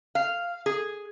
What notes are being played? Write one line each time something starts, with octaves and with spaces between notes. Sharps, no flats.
F5
G#4